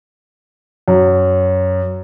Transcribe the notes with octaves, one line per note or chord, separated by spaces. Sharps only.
F#2